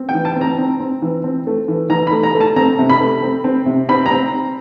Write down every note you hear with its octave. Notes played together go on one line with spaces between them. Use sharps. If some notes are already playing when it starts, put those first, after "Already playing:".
Already playing: C4
G5
E3
A5
C4
A#5
C4
C4
E3
C4
A3
E3
E3 A#5
B5
A3
A#5
A3
A5
C4 A#5
C3
B5
A3
C4
C4
C3
C4 B5
A#5
C4